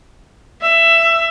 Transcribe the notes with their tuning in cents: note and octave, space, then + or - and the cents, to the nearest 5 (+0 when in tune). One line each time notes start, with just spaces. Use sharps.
E5 +15